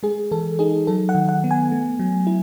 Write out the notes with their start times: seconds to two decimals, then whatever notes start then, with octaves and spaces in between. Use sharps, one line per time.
0.03 G#3 G#4
0.31 E3 A4
0.59 D#4 G#4
0.87 F#3 A4
1.09 F#5
1.15 D#3
1.29 F#5
1.44 B3
1.51 G#5
1.72 A3
1.99 F#3
2.27 E4